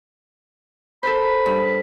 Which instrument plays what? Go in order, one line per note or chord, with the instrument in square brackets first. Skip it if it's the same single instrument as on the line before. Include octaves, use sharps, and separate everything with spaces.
[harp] A4 A#4 C5 [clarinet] B5
[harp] G2